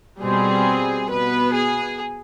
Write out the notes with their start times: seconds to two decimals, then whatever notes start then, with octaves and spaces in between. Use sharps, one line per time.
0.21 B2 G3 C4 G#4
1.10 B2 B3 B4
1.54 G#4